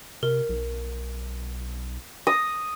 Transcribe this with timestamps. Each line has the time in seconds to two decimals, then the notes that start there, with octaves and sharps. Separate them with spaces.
0.23 C3 A#4
0.49 B1
2.27 D#6 A#6